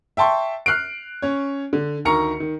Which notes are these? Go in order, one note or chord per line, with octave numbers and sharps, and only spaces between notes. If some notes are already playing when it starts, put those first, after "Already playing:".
E5 G5 A5 C6 C#6
F6 F#6 C7 D7
C#4 C#5
D3
D2 D#3 A#4 A#5 C#6 C#7
D#3